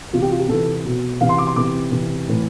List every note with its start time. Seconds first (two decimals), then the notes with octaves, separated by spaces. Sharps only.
0.13 C3 E3 F4
0.22 G4
0.31 F4
0.39 G4
0.48 C3 E3 A4
0.85 B2
1.21 C3 E3 F5
1.29 C6
1.38 D6
1.47 C6
1.56 C3 E3 D6
1.92 C3 E3
2.28 A2 E3